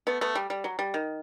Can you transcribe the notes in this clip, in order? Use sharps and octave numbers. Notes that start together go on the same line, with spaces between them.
A3 B3
A3 B3
G3
G3
F#3
G3
D#3